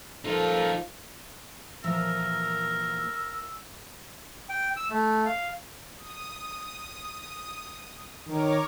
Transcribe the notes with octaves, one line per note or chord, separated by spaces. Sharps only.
F3 D#4 F4 A4 A#4
A#2 E3 F3 A#4 E6
G5
E6
A3
F5
D#6
D#3 A#4 C#5 D6